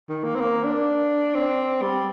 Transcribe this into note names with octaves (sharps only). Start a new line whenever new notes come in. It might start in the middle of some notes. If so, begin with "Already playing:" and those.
D#3
A#3
C4
A#3
D4
C4
G3